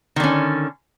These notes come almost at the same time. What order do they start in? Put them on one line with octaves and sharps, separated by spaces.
D#3 D3 C#4